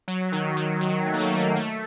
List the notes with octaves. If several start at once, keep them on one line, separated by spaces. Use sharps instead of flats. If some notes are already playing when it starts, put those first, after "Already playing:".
F#3
D#3
F#3
F#3
A3
A#3
A3
A#3
A3